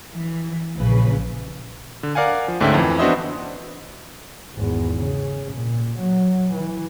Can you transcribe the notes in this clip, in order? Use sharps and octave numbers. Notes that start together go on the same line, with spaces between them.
E3
A#1 C#3 B4
D3
A#4 D5 F5 F#5 G#5
F3
D2 G#2 D3 C#4 E5 G5
F2 E3
B3 D4 F#4 C5 D#5 E5
G#1 E2
C#3
A#2
F#3
E3